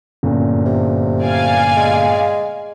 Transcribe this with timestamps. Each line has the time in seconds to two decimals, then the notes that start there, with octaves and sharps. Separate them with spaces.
0.23 G1 F#2 A#2
0.66 C3
1.22 D5 F5 G#5
1.77 G#3